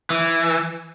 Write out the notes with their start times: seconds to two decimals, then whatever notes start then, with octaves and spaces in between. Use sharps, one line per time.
0.10 E3